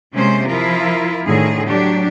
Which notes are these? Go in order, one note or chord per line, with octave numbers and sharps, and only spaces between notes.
C3 G#3 A#3 C#4 C5
F3 E4 F4 A#4
A2 D3 D#3 G#4
F#3 D4 G4